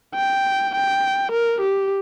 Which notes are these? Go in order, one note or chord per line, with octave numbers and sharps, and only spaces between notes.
G5
G5
A#4
G4